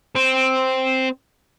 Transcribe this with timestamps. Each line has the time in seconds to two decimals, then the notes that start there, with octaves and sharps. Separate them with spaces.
0.15 C4